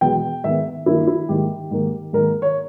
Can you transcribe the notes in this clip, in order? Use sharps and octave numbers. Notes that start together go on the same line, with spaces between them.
E2 B2 G#3 B3 G5
G#2 D#3 G#3 B3 E5
G2 D#3 A#3 E4
E4
G#2 D#3 G3 A#3 G4
G#2 D#3 A#3
G#2 D#3 A#3 A#4
C#5